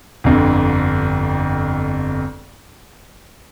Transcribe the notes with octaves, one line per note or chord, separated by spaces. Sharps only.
G1 F2 D3